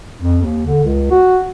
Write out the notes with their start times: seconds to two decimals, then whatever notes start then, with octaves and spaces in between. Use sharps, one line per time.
0.20 F2
0.42 D#2
0.66 D3
0.84 C#2
1.10 F#4